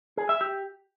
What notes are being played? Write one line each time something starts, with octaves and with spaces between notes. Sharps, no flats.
G#4
E5
G4